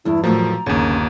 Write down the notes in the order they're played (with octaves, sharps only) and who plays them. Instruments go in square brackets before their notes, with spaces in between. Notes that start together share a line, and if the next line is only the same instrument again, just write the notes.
[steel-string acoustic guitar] E2 G2 [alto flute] E4
[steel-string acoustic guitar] E2 A2 D#3 [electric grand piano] F3 F#3 [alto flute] A#5
[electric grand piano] G1 D#2 [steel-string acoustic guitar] C#3